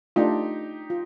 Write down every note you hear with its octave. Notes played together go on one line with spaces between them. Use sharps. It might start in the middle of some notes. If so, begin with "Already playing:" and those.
A3 D4 D#4 F4 G4
F4